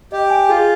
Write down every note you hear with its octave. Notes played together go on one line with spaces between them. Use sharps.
G4 D#5
G#5
F4 G#4